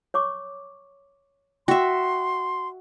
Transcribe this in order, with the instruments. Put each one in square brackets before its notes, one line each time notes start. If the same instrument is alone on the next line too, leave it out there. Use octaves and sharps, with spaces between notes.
[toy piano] C#5 C#6 D6
[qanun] F#4 E5 [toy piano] G5 [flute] C6